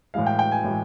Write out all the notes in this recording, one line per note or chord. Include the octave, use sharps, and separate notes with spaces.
A2 E3 G#3 F5
G5
G5
G#5
A2 E3 G#3